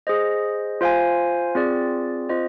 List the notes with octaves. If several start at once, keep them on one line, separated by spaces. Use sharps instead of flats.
G#4 C5 D#5
F4 C5 F5 G#5
C4 F4 G#4 D5
C4 F4 C5 D#5